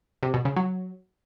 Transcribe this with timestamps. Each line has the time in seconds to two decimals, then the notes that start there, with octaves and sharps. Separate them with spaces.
0.23 C3
0.34 B2
0.45 C#3
0.56 F#3